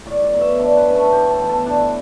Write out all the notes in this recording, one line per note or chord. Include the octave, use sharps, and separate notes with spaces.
A2 D5
D5
F#3 B3
E5
D3 D5
B4
A3 C#4
A4
A2 G4
A4
E3 B3
A4
A2 D4